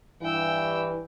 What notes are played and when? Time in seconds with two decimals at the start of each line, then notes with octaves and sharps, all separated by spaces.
0.22 G2 E3 G5 E6